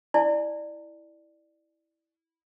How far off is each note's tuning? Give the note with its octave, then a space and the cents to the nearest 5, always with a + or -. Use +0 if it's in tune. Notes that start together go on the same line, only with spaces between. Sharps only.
E4 -10 D5 +20 G#5 +35